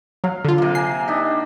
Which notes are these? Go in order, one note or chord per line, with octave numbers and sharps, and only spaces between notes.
F#3 F5
D3 F4
C3 A#3
G#5 A#5 C7
D4 D#4 G4